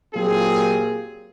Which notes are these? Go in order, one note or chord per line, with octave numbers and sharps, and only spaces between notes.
A#2 F#3 C4 F4 G4 G#4